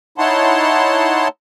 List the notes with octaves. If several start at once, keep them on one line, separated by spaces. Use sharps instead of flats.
D#4 E4 C#5 F#5 A5 C6